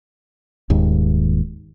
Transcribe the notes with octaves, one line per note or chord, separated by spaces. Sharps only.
D#1 D#2 G#2